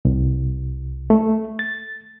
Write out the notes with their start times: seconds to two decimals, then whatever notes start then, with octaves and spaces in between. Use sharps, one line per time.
0.05 C2
1.10 A3
1.59 A6